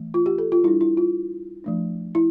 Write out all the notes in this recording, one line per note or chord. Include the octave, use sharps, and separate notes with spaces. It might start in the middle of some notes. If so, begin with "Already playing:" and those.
Already playing: E3 A3
F4
G4
A4
F4
G3 D4 E4
E4
F4
F3 A3 D4
E4